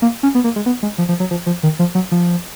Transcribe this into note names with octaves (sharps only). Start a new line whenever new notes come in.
A#3
C#4
B3
A#3
G#3
B3
G#3
F3
F3
F#3
F3
F3
D#3
F3
F#3
F3